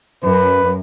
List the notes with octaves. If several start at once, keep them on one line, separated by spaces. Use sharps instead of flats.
F#2 B4